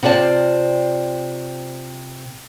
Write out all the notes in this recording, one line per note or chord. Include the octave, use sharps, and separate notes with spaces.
C3 C4 F4 D5 F5 A5